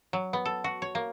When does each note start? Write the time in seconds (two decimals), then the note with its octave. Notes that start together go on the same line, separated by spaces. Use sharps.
0.13 F#3
0.33 B3
0.45 A4
0.64 F#4
0.82 C#5
0.95 A#3